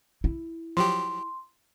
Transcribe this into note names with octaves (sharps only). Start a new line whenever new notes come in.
E4
F3 F#3 G4 C6